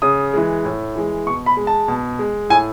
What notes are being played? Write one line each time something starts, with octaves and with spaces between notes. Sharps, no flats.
C#3 D#6
E3 G#3
A2
E3 G#3
B2 C#6
B5
G#3
A5
B2
G#3
A2 G#5